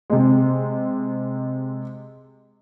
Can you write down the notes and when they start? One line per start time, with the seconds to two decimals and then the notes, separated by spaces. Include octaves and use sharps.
0.10 C3 G#3